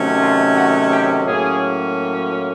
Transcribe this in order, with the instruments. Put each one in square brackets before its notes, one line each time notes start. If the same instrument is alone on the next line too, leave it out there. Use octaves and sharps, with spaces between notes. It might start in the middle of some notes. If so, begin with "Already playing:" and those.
Already playing: [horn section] C3 D#3 F#3 A3 C#4
F4
F#4
G4
A2 F#3 A#3 C#4 G#4